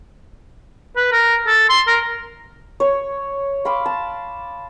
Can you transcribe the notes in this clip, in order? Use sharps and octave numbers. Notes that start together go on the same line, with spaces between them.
B4
A#4
A4
C6
A#4
C#5
F5 B5 C6 D6
A5